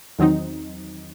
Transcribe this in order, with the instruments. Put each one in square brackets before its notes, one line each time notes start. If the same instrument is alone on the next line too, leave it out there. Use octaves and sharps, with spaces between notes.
[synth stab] E2 D#3 F#3 C4 D#4